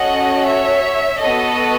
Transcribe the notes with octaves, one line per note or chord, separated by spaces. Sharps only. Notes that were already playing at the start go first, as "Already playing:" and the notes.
Already playing: C#4 F#4 A4 D#5 F#5
C#5 E5
B3 F#4 A4 D#5